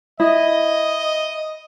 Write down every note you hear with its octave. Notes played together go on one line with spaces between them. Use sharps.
E4 D#5